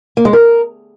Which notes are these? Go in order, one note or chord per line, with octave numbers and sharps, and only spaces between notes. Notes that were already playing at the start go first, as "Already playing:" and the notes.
A#3
G#3
A#4